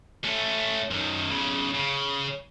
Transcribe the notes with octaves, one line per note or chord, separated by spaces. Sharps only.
A3 C#4
F#2 D#3
B1 C#3
C#3